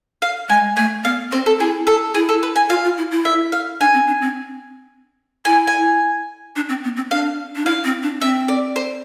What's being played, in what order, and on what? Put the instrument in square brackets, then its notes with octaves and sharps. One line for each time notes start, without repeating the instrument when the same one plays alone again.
[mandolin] F5
[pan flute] G#3 [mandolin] G#5
[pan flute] A3 [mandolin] G#5
[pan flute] B3 [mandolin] F5
[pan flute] C4 [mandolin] C5
[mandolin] A4
[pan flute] E4 [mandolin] G#4
[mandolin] A4
[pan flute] E4 [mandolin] G#4
[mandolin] A4
B4
G#5
[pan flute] F4 [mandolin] F5
[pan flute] F4
E4
E4
[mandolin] E5
F5
[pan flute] D4 [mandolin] G#5
[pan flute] C4
D4
C4
[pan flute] E4 [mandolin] G#5
[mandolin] G#5
[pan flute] D4
C4
B3
C4
[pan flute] D4 [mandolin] F5
[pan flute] D4
[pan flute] E4 [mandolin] F5
[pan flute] C4
D4
[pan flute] C4 [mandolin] E5
[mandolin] D5
C5